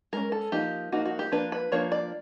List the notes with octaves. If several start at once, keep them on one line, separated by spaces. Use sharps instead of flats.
G#3 C#4 A#4
A4
F3 A#3 D#4 G4
F3 A#3 D#4 F#4
F#4
G4
F3 A#3 D4 B4
B4
F3 A#3 D4 C#5
D5